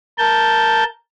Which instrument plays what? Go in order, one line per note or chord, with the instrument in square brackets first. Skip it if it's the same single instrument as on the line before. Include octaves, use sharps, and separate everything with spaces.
[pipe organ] A#4 A5 G6